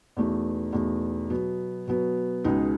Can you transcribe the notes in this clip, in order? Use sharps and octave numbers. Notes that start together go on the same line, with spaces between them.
E2 B2 A3 D#4
E2 B2 A3 D#4
B2 F#3 B3
B2 F#3 B3
C#2 B2 G#3 D#4